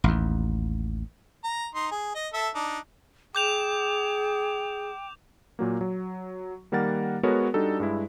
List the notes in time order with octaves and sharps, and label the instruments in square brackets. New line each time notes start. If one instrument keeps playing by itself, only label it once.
[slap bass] A1 D#2
[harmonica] A#5
D#4 C6
G#4
D#5
A4 E5 E6
D4 D#4
[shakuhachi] G#4 [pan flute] G5 [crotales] D6 G6 F7
[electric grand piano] A#2 F#3 A#3
F#3
D#3 G3 A#3 A#4 F#5 A6
G#3 B3 F#4 A4 A#4 C#5
G3 D4 D#4 F#4 A4
G2 G#3 E4